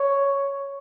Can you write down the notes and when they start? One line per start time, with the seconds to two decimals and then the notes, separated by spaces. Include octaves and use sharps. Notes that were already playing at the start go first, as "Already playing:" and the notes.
Already playing: C#5